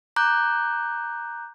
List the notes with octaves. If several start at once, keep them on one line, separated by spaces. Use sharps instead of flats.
A#5 D6 F#6 G6